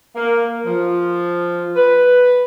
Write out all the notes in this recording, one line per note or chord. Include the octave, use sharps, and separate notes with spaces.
A#3
F3
B4